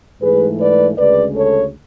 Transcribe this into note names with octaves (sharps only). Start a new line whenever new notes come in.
G#2 E3 A3 G#4 B4
B4 D5
D2 C#3 G#3 B4 D5
A4 C#5